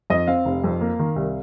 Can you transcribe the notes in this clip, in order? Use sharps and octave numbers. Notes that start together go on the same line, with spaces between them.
F2 D#5
C4 F5
F1
F2
A#3
D#3
C2